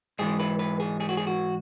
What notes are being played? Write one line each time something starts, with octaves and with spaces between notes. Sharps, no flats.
G#2 E3 G#3 G#4
B4
B4
G#4
G#4
F#4
G#4
F#4